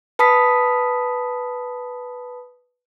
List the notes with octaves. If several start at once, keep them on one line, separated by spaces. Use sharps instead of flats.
B4 A5 B5 D#6 B6